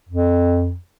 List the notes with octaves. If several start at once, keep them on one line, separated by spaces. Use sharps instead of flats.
F2